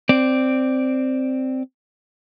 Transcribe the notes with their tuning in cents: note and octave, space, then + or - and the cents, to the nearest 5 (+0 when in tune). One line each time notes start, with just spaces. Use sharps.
C4 +0 D5 +0